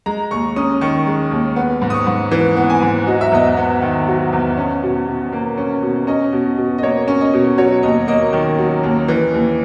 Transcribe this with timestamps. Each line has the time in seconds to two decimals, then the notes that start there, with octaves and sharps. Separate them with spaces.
0.06 G#3 A#5
0.31 D#2 C#6
0.56 C#4 D#6
0.81 D#3 C#6
1.07 G#3
1.31 D#2
1.56 B3
1.82 G#2
1.90 D#6
1.94 C#6
2.07 G#2
2.31 E3
2.56 B3
2.70 G#5
2.82 G#2
3.07 F#3 D#5
3.21 E5
3.32 E2 D#5
3.57 B3
3.82 D#3
4.08 F#3
4.33 E2
4.57 C#4
4.83 B2
5.08 B2
5.33 A#3
5.58 C#4
5.83 B2
6.07 C#4 D#5
6.33 B2
6.58 B2
6.78 D#5
6.83 A#3 C#5
7.08 C#4
7.21 D#5
7.33 B2
7.58 F#3 C#5
7.83 D#2 D#5
8.08 A#3 D#5
8.33 D#3
8.59 F#3
8.83 D#2
9.08 E3
9.34 D#2